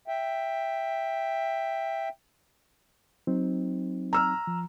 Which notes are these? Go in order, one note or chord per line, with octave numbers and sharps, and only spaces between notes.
E5 G5
F#3 C4 D#4
A#5 E6 F6
F3